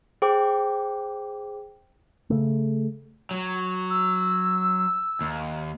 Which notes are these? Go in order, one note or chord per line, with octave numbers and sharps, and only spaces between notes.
G#4 C5 G5 D6
C#3 A3
F#3
E6
D#2